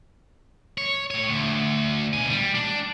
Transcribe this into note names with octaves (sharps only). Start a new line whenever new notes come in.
C#5
A3 C#5
D2
B2 G#5
G3
D4